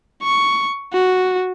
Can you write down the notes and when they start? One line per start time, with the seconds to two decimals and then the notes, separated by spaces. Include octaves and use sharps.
0.23 C#6
0.93 F#4